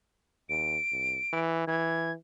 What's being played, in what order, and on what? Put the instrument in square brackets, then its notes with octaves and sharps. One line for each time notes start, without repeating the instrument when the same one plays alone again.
[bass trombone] D#2 [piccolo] D7
[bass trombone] C2
E3
[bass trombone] E3 [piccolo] G#6